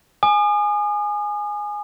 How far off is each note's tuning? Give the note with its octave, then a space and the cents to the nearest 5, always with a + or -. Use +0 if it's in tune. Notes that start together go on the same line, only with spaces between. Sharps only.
G#5 +0 D#6 -40